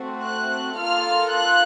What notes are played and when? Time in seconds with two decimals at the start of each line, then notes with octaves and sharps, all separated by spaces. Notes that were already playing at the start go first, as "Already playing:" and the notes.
Already playing: A3 C4 F#4
0.22 F#6
0.78 A#3 F4 A4 F6
1.33 F#6